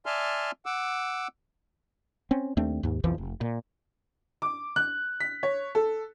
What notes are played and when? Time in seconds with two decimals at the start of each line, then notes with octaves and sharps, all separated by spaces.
0.06 D5 E5 G#5 A5 C6 F6
0.66 F#5 D6 E6
2.31 C4 C#4
2.57 D#2 A3 C4 D4
2.83 D#2 G#2
3.04 B1 F2 E3 F3
3.18 F1
3.41 A#2
4.42 D6
4.76 F#6
5.20 B6
5.43 C#5
5.75 A4